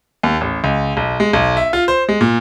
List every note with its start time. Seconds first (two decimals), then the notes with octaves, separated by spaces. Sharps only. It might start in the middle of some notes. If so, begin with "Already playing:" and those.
0.23 D#2
0.41 A1
0.64 C#2
0.97 B1
1.20 G#3
1.33 B1
1.57 E5
1.73 F4
1.88 C5
2.09 G#3
2.21 A#2